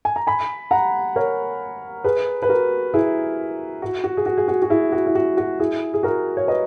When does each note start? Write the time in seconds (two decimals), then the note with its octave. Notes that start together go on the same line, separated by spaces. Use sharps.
0.05 G#5
0.16 A#5
0.27 G#5 B5
0.71 F#5 A#5
1.16 A#4 C#5
2.04 G#4 B4
2.42 B4
2.49 F#4 A#4
2.94 E4 G#4
3.82 F#4
4.04 F#4
4.17 G#4
4.26 F#4
4.37 G#4
4.48 F#4
4.62 F#4
4.70 E4 G#4
4.92 F#4
5.07 E4
5.15 F#4
5.37 F#4
5.59 E4 G#4
5.94 G#4
6.03 F#4 A#4
6.37 C#5
6.47 B4 D#5